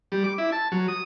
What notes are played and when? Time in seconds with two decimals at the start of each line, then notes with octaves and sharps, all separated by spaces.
0.12 G3
0.24 D6
0.38 E4
0.52 A5
0.72 F#3
0.88 D#6